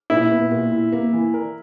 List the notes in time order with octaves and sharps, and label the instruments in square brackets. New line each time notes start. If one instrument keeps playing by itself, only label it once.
[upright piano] A#2 [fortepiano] E4
[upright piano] B3
A#2
E4
A#3
E3
A#4